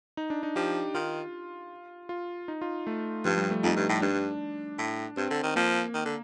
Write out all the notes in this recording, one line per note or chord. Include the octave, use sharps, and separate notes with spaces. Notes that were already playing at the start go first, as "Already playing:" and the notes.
D#4
D4
D#4
F3 G4
D#3 F4
F4
D#4
F4
A3
G2 F3
G3
A3
F2 D#4
G2
A2
G2 D4
A2
G2 C4
D3
D#3
F3 A#3
D#3
D3